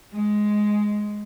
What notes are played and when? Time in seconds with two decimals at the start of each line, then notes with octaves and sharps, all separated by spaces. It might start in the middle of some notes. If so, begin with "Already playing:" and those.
0.12 G#3